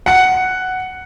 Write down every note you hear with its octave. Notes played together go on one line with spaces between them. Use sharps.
F#5 C#7